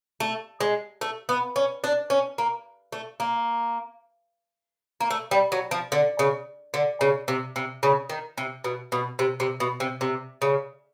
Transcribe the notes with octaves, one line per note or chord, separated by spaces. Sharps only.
A3
G#3
A3
B3
C#4
D4
C#4
A#3
A3
A#3
A#3
A3
G3
F#3
F3
D3
C#3
D3
C#3
C3
C3
C#3
D#3
C3
B2
B2
C3
C3
B2
C3
C3
C#3